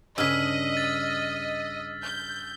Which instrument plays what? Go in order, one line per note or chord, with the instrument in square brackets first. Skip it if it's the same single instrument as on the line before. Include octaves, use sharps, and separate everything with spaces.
[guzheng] G2 C#3 [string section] D#5 [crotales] E6 F6 B6
[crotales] A6
[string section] G6